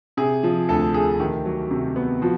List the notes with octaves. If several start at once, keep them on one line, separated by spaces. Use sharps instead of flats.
C3 G#4
F3
D2 A4
A3 G#4
D#3 G4
F#3
C3
B3
F3 F#4